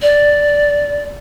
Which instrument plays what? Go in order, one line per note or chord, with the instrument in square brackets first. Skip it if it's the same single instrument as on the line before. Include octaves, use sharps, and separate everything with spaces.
[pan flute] D5